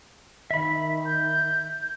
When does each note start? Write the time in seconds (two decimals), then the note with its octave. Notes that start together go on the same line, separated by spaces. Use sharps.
0.51 D#3 E5 B5
1.06 G6